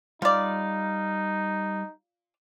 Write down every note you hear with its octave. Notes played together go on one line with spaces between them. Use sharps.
G3 D#4 F4 D5 F5